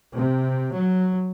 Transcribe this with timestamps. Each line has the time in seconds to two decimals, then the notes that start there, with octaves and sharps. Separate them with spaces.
0.17 C3
0.76 F#3